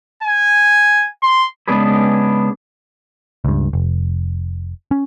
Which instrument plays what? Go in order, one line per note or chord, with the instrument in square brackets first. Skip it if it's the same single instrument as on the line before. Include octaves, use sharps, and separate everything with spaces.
[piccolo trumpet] G#5
C6
[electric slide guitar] C#3 G#3 B3 D4 G#4 B4
[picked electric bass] C#2 G2
F1
C#4